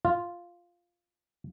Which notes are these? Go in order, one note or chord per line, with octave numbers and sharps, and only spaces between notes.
F4